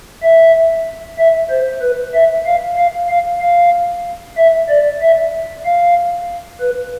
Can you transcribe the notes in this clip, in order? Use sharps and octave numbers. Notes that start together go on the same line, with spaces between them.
E5
E5
C5
B4
E5
F5
F5
F5
F5
E5
D5
E5
F5
B4